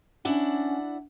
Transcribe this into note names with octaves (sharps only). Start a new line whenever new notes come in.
C#4 D4 E4 F#5